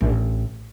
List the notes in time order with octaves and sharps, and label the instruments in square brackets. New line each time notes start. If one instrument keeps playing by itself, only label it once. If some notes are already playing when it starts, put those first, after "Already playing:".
[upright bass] A1